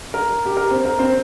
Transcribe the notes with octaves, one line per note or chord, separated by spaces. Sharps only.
A#4
G4
A#4
C4 C5
A#4
C4 C5